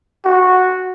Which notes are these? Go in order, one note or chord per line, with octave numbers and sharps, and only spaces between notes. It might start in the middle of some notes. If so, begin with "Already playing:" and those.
F#4